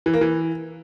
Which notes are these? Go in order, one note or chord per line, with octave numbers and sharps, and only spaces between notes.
E3
A#3
E3